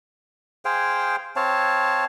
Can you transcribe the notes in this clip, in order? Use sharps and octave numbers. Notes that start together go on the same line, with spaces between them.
G#4 C5 F5 G5
C4 C#5 F5 A5